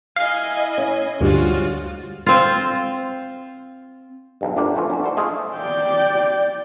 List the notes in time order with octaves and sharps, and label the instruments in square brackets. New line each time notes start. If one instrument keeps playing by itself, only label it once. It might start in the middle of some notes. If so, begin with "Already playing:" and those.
[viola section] E4 D#5 G#5 [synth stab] F5
[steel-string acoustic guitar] C#4
[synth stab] D2 G2 G3 [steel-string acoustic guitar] F3 [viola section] G#3 F4 F#4
[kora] C4 F4
[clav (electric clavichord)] B1 G2
G1 D2 A#3 D4 G4
E3 F3 A3 C#4 F4
F#3 C#4 D4 F#4
A4 C5 D5
A3 F4 G#4 D#5
[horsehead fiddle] D5 G5